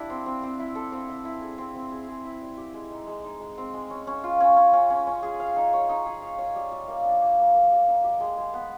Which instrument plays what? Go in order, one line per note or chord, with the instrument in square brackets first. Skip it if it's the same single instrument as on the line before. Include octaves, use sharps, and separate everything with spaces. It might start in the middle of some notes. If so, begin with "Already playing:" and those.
Already playing: [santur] D4 E4 G4
C4
C4
C4
E4
A4
C4
E4
E4
G#4
C4
C4
G#4
G#4
E4
G3
G4
G#3
D#4
G#3
D#4
G#3
C4
G#3
C#4
C#4
F4
C#4
C#4
C#4
C#4
C#4
G#4
F5
D#4
C#5
D#4
G#4
F5
C#5
G3
G3
A#3
D4
A#3
A#3
A#3
G3
D#4
G4
G#3
G#3
B3